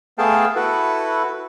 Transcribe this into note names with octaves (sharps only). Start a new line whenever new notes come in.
A3 B3 G#4 F5 G5 A5
E4 F#4 A4 B4